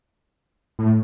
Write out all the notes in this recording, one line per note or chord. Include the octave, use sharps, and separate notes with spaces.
A2